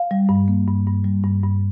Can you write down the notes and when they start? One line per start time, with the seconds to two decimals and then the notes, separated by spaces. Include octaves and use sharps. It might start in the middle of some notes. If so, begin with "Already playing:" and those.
Already playing: F5
0.11 G3
0.29 G2
0.48 A#3
0.68 G2
0.87 G2
1.05 G3
1.24 G2
1.44 G2